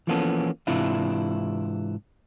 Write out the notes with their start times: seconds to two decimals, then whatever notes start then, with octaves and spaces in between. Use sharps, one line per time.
0.07 E3 F3 A#3 B3 C#4 A4
0.67 G#2 C3 E3 D4 E4 F4